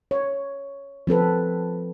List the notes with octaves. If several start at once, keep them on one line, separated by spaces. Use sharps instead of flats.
C#5
F3 C4 A4 B4